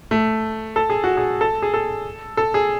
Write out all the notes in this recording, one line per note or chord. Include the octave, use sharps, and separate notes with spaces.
A3
A4
G#4
F#4
G#4
A4
G#4
A4
A4
G#4